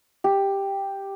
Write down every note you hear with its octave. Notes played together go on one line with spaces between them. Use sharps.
G4